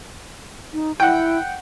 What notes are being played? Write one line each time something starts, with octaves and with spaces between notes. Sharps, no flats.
D#4
E4 F#5 G5